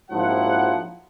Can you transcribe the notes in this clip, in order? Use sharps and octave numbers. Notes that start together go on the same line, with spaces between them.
A#1 G#2 F3 F#3 E4 F#5